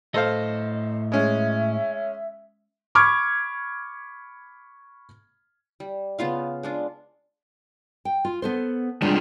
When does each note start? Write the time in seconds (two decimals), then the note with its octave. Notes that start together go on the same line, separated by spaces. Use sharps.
0.14 A2 A4 C5 D#5 F5
1.12 G#3 C#4 E5
2.95 B5 C#6 D6 F6 G#6
5.80 G3
6.19 C#3 B3 F4 F5
6.63 G#3 D4 F4
8.05 G5
8.25 F4
8.42 B3 A4 C5
9.02 G3 G#3 D4 F4